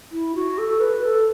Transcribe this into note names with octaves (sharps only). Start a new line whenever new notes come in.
E4
F#4
A4
B4
A4